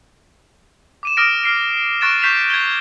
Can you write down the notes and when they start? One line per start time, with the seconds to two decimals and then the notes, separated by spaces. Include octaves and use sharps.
1.03 D6 D#7 E7
1.17 D6 D#6 F6 A#6 D7 E7
1.44 F6 C7 D7
2.01 C#6 F#6 A6 D7 E7
2.22 C#6 G6 B6 C7 E7 F7
2.50 G#6 G7